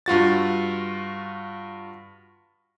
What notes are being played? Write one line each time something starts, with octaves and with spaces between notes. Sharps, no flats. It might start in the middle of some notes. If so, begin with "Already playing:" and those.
G2 F4 F#4 A6